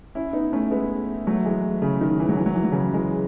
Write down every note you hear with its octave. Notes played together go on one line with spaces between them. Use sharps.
C#4 E4
B3 D#4
A3 C#4
G#3 B3
F#3 A3
E3 G#3
C#3
D#3
E3
F#3
E3
F#3
E3
F#3
C#3 E3
E3 G#3